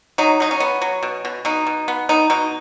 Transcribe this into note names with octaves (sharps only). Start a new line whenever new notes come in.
F#3 D#4
F#3 D#4
C#4
B3
F#3
B2
B2
B2 D#4
B2
B3
B3 D#4
B2 D#4